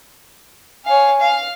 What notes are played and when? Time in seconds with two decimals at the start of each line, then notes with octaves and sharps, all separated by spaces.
0.85 C#5 F5 G#5
1.20 F5